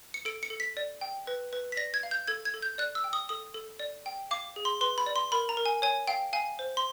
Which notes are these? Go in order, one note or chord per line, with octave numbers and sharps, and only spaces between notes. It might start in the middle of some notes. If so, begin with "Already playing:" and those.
C#7
A4 D7
C#7
A4
B6
D5
G5
B4
B4
B6
D5 A#6
G#6
F5
G6
A4 G#6
G#6
A4
G6
D5 F#6
E6
G5
D#6
A4 D#6
A4
D5
G5
F5 D6
G#4
C6
B4 C6
B5
D5
C6
A#4 B5
A#5
A#4
G#5
C#5 G#5
F5 G5
F5 G#5
C5
C6